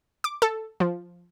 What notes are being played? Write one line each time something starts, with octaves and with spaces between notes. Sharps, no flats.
D6
A4
F3